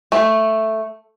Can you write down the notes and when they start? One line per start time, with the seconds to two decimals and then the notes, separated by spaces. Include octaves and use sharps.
0.12 A3